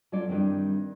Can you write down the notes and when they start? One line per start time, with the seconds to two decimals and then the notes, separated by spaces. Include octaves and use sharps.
0.12 F#3 A3 C#4 F4 D5
0.28 G2 D#3 C4 E4